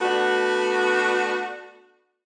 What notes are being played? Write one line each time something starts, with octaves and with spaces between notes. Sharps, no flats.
A3 B3 D4 F#4